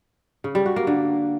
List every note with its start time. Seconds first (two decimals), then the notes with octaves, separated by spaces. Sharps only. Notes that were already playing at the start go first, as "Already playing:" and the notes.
0.44 C#3
0.55 G3
0.66 F#4
0.76 A#3
0.87 D3